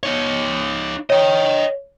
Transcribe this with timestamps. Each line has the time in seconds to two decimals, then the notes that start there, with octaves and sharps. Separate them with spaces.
0.03 D#4 C#5
1.10 C#5 D#5 G5